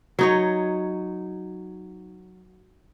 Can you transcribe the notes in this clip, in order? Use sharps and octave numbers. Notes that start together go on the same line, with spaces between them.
F#3 D#4 C#5